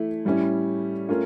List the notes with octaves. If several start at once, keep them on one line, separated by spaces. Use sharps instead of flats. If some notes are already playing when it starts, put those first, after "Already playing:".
Already playing: E3 A3 E4
A2 G3 C#4 E4
A3 C#4 F4 A#4